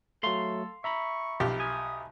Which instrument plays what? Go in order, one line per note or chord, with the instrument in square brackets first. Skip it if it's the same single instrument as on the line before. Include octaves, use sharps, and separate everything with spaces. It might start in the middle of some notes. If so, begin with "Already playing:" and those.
[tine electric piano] F#3 A3 [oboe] A4 [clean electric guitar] F5 C6
[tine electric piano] E5 A#5 B5 [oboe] C#6
[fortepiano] B1 F3 G4
[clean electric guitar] G#5 [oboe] D#6